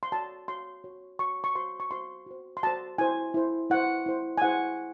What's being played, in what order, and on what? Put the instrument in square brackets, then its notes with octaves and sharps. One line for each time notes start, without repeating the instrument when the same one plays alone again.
[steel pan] C6
F#4 C#5 A5
F#4 C#5 C6
F#4 C#5
F#4 C#5 C#6
C#6
F#4 C5 C6
C#6
F#4 C5 C6
F#4 C5
C6
F#4 C5 A5
E4 C5 G#5
E4 C5
E4 C5 F#5
E4 C5
G#5
E4 G#4 C5 F#5